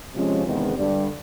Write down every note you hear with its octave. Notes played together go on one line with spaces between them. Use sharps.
C3 F3 G#3 C#4 F4
E2 C3 D#3 G#3 B3
G2 D3 G3